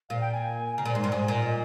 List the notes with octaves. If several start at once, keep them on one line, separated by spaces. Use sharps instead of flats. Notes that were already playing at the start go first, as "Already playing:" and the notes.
A#2 F5
G5
G#5
C#3 A#5
A#2
G#2 C6
G2
G#2 G#5
A#2
D#5